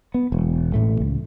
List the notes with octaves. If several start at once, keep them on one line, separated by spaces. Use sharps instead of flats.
B3
E1
A1 A2 A3
C#2